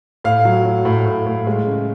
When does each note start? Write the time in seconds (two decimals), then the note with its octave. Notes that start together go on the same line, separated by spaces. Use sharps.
0.24 A2 F5
0.45 F#3
0.65 F#3
0.85 A2
1.06 A2
1.26 A2
1.47 G#3
1.67 C#3